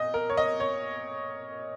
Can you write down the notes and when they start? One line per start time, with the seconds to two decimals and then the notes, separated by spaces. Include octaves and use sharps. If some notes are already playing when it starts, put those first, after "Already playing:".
Already playing: A#2 D#5
0.14 A#4
0.30 C#5
0.37 D#5
0.60 C#5